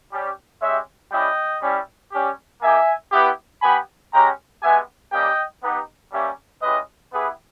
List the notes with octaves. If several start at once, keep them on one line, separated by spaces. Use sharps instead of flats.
G3 C#4 G4
G#3 C#4 G4 C#5 E5
G3 C#4 E4 G4 D#5 G5
G3 C#4 E4
G3 C#4 G4
A#3 D#4 G4 E5 G#5
B3 E4 G4
B3 G4 G#5 B5
G#3 C#4 G4 G5 A#5
G#3 B3 G4 E5 G#5
G3 A#3 C#4 G4 D#5 G5
B3 D#4 G4
G3 A#3 C#4 G4 C#5 E5
G#3 C#4 E4 G4 B4 D#5
B3 E4 G4 G#4 B4